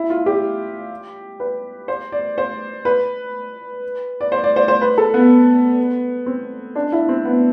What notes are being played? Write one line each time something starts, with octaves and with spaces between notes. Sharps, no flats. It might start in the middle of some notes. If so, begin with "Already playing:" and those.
Already playing: E4
F4
G4
B4
C5
D5
C5
B4
D5
C5
D5
C5
C5
B4
A4
B3
C4
D4
E4
C4
B3